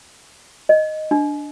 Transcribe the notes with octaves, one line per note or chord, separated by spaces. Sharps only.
D#5
D4